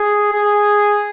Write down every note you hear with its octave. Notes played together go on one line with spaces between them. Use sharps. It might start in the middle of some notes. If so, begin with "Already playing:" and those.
Already playing: G#4
G#4